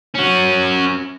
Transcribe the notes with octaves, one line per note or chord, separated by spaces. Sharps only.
C#4 F#4